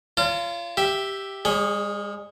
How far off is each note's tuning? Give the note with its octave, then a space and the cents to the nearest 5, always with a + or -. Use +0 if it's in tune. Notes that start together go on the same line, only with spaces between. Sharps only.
F4 -25 C#5 +35 A5 +40
G4 +0 E5 +0
G#3 -45 G#4 +0 C#5 +0